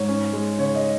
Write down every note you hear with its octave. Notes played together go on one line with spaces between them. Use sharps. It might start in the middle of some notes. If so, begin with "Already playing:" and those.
Already playing: G#2 C#5
C#4
G#3
C#3 C#5
D#5